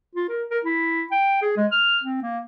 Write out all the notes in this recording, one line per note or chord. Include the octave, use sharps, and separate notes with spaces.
F4
A#4
A#4
E4
G5
G#4
G#3
F6
C4
A#3